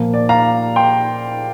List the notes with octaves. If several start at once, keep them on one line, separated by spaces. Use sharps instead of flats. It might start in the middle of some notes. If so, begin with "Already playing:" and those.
Already playing: A#2 F3 A#3
D5
F5 A#5
G5 C6